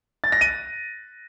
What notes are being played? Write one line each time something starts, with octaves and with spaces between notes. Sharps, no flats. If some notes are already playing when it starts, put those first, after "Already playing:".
A6
A#6
D#7